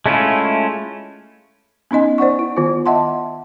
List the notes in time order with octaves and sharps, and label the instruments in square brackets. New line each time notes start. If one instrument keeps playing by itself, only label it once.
[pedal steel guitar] G#3 A3 C#4 E4 F4
[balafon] B3 C#4 D#4 D#5 G#5
C5 D5 F#5 C#6
E4
D#3 B3 F4
D#5 E5 F#5 A5 C6